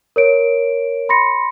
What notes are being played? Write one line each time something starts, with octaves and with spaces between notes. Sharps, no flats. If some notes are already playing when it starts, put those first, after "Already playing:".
A#4 C#5 D7
B5 C6 A#6 C#7